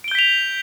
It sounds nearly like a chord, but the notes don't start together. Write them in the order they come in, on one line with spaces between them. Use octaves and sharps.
D7 G7 G6 B6 F7